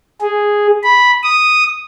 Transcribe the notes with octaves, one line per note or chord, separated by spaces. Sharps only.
G#4
B5
D#6